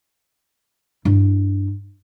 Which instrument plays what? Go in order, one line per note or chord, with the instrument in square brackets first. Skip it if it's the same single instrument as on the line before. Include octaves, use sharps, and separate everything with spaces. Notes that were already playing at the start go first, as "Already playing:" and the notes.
[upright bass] G2 E4